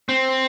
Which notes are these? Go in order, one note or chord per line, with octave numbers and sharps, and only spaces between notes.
C4